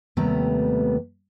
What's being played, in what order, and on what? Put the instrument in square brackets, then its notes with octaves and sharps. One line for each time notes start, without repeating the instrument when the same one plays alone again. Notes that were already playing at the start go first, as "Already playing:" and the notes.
[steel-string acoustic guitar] D#2 C3 G3 A3 B3 A#5